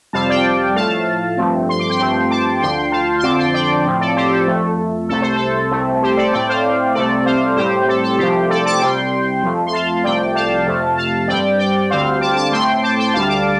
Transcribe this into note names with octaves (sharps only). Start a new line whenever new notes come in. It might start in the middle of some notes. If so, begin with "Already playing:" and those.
F2 C3 G3 C4 F5 A5
D5 G5
A2 F3 A3 F5 A5
G2 F3 A3 C4
C6
D6
G5 C6
G2 F3 A3 C4
A5 D6
D2 D3 F3 G5 C6
F5 A5
C6
F2 D3 F3 C4 A5 D6
G5 C6
D5 G5
A2 F3 C4
A4 D5
G4 C5
A4
F2 F3 A3
C2 C3 A3 A4
C5
A4
C2 C3 A3 C4
G4 C5
A4 D5
A2 A3 C4 D5 G5
C5 F5
C2 C3 A3 C4 A4 D5
C5 F5
A2 G3 C4 G4 C5
A4
A4
C2 C3 F3 A3 G4 C5
A4 D5
A5 D6
C2 C3 G3 G5 C6
F2 F3 A3
C6
F5 A5
C2 C3 F3 A3 D5 G5
F5 A5
F2 C3 A3
F5 A5
G2 G3 C4 D5 G5
D5 G5
D2 D3 G3 C4 C5 F5
A5 D6
A5 D6
A2 A3 C4 G5 C6
A5 D6
G5 C6
D2 D3 G3 F5 A5
A5 D6